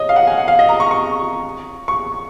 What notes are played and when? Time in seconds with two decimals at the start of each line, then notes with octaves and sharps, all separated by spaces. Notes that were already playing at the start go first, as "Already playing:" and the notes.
Already playing: C#5 D#5
0.09 F5
0.16 F#5
0.27 G#5
0.38 F#5
0.48 F5
0.59 D#5
0.69 A#5
0.80 C#6
0.91 C#6
1.88 C#6